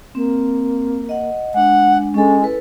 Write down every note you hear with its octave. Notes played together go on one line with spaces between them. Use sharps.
A#3 C4
D#5 F#5
G#3 D4 F#5
G#3 C#4 A4
E4 A4 B4